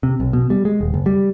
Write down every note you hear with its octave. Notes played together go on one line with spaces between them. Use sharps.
C3
B1
B2
G3
G#3
D#1
F#1
G3